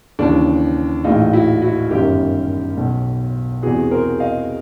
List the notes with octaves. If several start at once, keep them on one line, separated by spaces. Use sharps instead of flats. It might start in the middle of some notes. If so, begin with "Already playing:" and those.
D#2 C#3 E3 D4
A#1 A2 E3 D#4 F4
E4 F#4
E4 F#4
G1 F#2 D#3 F4 G4
B1 B2
E2 C3 E3 F#4 G#4
A#4 C5
D#5 F5